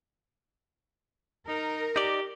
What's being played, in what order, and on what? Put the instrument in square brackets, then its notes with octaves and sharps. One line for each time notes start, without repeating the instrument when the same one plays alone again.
[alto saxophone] D#4 [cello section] A#4
[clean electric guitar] D#4 D5 [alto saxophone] G4